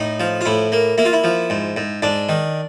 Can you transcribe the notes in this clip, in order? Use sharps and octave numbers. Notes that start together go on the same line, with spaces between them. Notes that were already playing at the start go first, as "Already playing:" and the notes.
Already playing: A2 D#4
F3
F4
A2 E4
A#3
A#3 E4
F4
E4
F3
G#2
G#2
G#2 D4
D#3